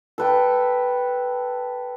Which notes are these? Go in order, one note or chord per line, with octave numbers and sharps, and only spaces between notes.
A4 B4 G5